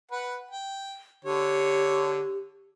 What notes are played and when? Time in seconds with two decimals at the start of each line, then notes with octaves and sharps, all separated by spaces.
0.11 B4 F#5
0.51 G5
1.25 D3 G4 C#5